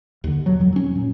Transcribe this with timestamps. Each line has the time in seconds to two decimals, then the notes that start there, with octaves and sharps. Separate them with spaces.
0.24 D#2 D3
0.46 B2 F#3
0.60 F2 F#3
0.73 F#3 C#4
0.95 A#2